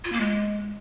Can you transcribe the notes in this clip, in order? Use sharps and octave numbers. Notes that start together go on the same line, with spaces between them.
F4
A#3
G#3